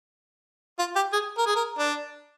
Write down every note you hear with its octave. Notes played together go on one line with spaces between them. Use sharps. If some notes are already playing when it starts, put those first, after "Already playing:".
F4
G4
G#4
A#4
G#4
A#4
D4